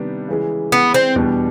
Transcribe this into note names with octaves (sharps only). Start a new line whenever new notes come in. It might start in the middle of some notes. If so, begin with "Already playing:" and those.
Already playing: C3 D#3 G3 B3 D4
C#3 E3 G#3
B3
C4
E2 B2 G3 B3 D4